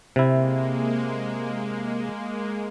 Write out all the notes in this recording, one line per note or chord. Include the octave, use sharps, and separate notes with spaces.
C3 G#3 A#3 E4